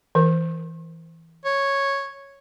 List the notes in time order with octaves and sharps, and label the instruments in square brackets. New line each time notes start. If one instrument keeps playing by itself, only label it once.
[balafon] E3 A#4
[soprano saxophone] C#5